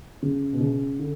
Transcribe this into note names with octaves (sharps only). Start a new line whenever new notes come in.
C#3
B2
C#3
D3